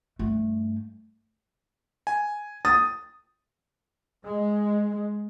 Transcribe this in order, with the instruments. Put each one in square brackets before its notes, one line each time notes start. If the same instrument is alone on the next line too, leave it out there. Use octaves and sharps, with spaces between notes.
[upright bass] G2 A3
[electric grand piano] G#5
[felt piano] D#6 [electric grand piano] A6
[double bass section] G#3